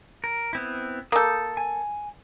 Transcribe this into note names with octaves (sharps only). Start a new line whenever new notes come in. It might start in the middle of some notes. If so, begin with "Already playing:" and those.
A#4
B3 C4 E4
A#3 A4 D#6 G6
G#5